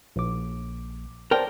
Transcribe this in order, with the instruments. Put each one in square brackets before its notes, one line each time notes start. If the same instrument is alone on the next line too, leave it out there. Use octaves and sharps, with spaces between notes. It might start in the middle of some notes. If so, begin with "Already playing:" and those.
[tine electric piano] A#1 D6
[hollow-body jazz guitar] A#4 G5 [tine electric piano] C5 D5 A5